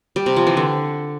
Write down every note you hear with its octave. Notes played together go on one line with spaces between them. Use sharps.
G3
C3
F3
E3
D3